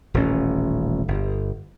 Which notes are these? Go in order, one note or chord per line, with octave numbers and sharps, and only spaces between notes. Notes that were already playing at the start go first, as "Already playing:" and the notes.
D#1 A1 C#4
G1